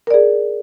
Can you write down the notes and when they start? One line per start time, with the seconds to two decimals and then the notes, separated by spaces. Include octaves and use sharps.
0.07 A#4
0.11 D5
0.14 G#4